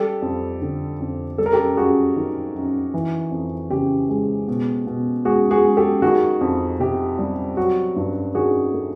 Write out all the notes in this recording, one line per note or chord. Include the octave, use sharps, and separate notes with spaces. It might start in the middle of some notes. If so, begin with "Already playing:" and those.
Already playing: G3 G4 A4
F2
D3
F2
G3 A4
A#4
G4 A4
F#2 F#4 G#4
D#3
F#2
E3
F2
C#3 G4
G#3
B2
B2
G#3 F#4 G#4
F#4 G#4
G#3
G4 A4
D#3 F#4 G#4
F2
C3 G4
G3
F#3 F#4
G2
D#3 F#4 G#4
A3